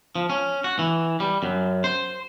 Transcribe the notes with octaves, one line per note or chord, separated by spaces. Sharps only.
F3
C#4
F#4
E3
G3
F#2
C5